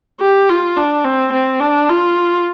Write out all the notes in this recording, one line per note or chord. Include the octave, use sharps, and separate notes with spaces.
G4
F4
D4
C4
C4
D4
F4